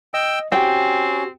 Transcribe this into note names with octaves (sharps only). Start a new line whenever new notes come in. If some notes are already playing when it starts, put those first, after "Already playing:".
D#5 G5 E6
C4 C#4 F#4 G4 G5